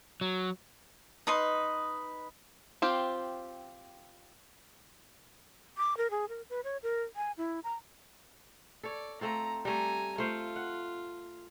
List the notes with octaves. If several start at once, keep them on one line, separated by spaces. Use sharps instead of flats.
F#3
D#4 B4 D#5 C6
C4 F4 G4
D6
A#4
G#4
A#4
B4
C#5
A#4
G#5
E4
A#5
A4 C#5 D5
A3 C4 F4 A#5
G3 A3 G#5 A#5
A3 F4 C5 F5
F#5